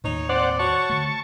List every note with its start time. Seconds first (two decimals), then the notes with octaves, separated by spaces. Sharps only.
0.04 D#2 A2 D#4 C#5
0.29 C4 C5 D5 F#5
0.59 F#4 C#5 A5 C#6
0.90 D3 A3